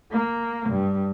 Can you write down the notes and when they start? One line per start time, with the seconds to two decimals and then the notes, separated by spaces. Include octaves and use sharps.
0.11 A#3
0.69 G2